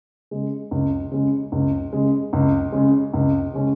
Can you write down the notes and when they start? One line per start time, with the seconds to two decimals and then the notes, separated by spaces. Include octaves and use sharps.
0.31 C#3 G#3
0.71 C#2
1.12 C#3 G#3
1.52 C#2
1.93 C#3 G#3
2.33 C#2
2.72 C#3 G#3
3.14 C#2
3.53 C#3 G#3 C#4 G#4